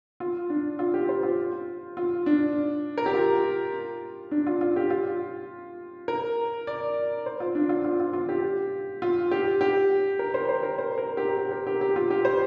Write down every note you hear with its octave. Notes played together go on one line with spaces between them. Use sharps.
F4
D4
F4
G4
C5
F4
F4
D4
A#4
G4
F4
D4
F4
F4
G4
F4
A#4
D5
C5
F4
D4
F4
F4
F4
F4
G4
F4
G4
G4
A#4
C5
C5
A#4
C5
A#4
G4
G4
A#4
G4
G4
F4
G4
C5